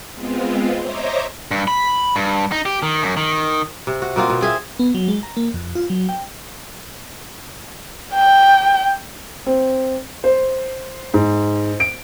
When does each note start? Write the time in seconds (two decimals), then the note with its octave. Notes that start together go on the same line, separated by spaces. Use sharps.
0.13 G#3 B3 C4 F4
0.80 C5 C#5 D#5 E5 A#5 D6
1.51 G2
1.68 B5
2.16 G2
2.52 D#4
2.66 G4
2.83 D#3
3.03 F#2
3.17 D#3
3.87 C3
4.02 F#4
4.16 B2 A#3 C4 F4
4.30 B2
4.41 C4 G#4 E5 F5
4.79 B3
4.95 F#3
5.08 G#3
5.23 A#5
5.37 A#3
5.54 F2
5.75 F4
5.90 F#3
6.09 G5
8.15 G5
9.46 C4
10.24 C5
11.14 G#2
11.80 D7